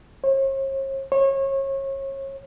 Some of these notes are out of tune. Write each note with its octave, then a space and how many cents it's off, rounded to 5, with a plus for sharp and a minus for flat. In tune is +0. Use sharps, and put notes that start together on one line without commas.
C#5 -45
C#5 -30